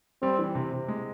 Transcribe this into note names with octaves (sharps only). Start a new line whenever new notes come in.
G3 C4
E3
C3
C3
G#3